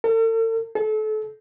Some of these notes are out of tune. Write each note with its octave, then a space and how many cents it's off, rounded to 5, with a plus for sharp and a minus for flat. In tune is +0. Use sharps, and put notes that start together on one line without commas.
A4 +45
A4 -30